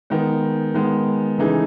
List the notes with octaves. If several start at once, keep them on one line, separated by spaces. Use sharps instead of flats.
D#3 G#3 B3
D#3 G#3 B3
C#3 E3 A3 D#4 G#4